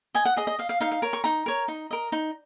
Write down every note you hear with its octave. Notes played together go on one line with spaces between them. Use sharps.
D#5 G#5
F#5
G#4 D#5
D#5
D#5 F5
F5
D#4 F5
F5
A#4 C#5
C#6
D#4 A#5
A#4 C#5
D#4
A#4 D#5
D#4